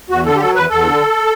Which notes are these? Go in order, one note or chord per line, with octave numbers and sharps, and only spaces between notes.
E2 F#4
D3 A4
G4
F#3 A4
E2 B4
E2 A4
D3